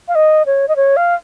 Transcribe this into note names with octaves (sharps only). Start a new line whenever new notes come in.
F5
D#5
C#5
D#5
C#5
F5